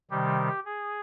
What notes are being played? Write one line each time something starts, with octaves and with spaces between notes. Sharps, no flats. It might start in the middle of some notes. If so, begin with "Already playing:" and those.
C3 D#3 G3 G4
G#4